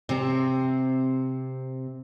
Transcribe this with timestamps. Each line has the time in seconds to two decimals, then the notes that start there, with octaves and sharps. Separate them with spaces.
0.09 C3 C4